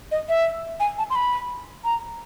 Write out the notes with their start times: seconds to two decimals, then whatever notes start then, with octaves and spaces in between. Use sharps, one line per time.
0.11 D#5
0.29 E5
0.80 G#5
0.98 A5
1.10 C6
1.15 B5
1.84 A#5